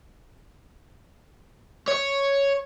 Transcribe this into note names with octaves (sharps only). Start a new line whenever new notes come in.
C#5